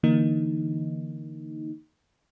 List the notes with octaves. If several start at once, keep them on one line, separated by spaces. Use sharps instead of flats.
D3 E3 A#3 D#4